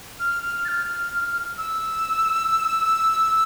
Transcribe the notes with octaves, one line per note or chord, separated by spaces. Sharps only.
F6
F6
A6
F6
E6